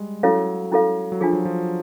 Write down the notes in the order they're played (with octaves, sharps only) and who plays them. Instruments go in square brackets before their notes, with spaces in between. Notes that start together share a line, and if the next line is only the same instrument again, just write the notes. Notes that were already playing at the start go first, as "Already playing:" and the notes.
Already playing: [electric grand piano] G3 G#3
[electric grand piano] F#3 [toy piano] C#4 E4 A4 C#5 F5
[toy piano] C#4 E4 A4 C#5 F5
[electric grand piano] F#3
[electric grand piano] F3 [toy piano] D4 F4 G#4
[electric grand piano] F#3
F3